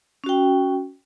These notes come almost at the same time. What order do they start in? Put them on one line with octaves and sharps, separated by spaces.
C#4 F#4 G5